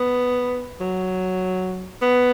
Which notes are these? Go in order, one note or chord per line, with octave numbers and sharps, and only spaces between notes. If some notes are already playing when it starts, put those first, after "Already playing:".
Already playing: B3
F#3
B3